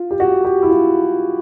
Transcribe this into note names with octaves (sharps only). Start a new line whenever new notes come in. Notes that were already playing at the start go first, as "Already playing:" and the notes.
Already playing: F4
G4
F#4
G4
E4
F4